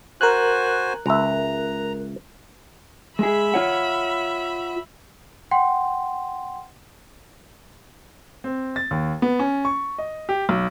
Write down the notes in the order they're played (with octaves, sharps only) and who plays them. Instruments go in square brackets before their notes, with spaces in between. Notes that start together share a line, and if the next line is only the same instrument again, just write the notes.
[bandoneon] F#4 C5 G#5 [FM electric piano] A#4 F#6
[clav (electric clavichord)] C#2 E5 [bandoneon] A#5
[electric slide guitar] G#3 G#4 [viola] E5 B5
[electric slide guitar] F4 C#5 F#5
[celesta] F#5 G5 C6
[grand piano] C4
A6
D#2
B3
C#4
C#6
D#5
G4
B1